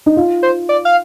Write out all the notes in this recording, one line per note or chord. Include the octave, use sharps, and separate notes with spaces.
D#4
F4
C5
D5
F5